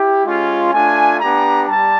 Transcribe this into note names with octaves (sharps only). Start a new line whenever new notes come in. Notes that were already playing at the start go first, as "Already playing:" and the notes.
Already playing: E4 G4
G#3 C#4 F4
A3 D4 F4 G#5
B3 D4 G4 A#5
G3 A5